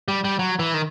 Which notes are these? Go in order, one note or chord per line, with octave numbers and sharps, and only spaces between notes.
G3
G3
F#3
E3
D#3